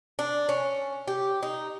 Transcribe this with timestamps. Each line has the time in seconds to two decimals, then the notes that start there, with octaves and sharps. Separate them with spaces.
0.19 D4
0.49 C#4
1.08 G4
1.43 D#4